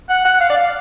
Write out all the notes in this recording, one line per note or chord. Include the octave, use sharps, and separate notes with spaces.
F#5
F#5
F5
D5
F5